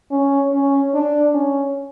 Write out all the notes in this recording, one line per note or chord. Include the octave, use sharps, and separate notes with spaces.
C#4
C#4
D4
C#4